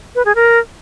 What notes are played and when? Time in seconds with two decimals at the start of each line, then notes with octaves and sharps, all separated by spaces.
0.15 B4
0.25 G#4
0.35 A#4